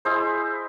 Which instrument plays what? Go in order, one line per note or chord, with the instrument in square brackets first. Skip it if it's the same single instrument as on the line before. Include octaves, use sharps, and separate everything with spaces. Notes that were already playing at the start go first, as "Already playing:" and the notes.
[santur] E4 G#4 C5 D#5